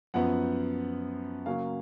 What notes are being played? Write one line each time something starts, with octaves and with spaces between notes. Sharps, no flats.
F#2 F3 B3 F#5
C#3 F#3 A#3 C#4 F5